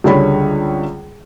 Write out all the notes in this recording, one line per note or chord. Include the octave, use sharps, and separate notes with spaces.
C#2 D3 G3 G#4 C#5 B5